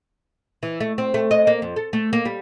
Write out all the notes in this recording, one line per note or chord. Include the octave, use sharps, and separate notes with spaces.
E3
A3
C4
A3
D#5
A#3
F2
A4
A3
A#3
G3